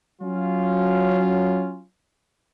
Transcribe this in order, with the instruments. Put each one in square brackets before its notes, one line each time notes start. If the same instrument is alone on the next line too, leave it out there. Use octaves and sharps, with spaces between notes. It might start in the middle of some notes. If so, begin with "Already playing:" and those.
[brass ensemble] F#3 C#4 F4